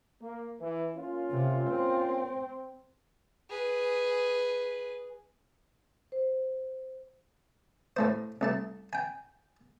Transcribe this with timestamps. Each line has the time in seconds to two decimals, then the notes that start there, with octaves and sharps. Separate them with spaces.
0.22 A#3
0.60 E3
0.96 A#3 C#4 F4
1.31 C3
1.70 C4
3.50 G#4 B4
6.12 C5
7.97 A2 A3 C5
8.41 C2 A3 A5
8.93 G5 G#5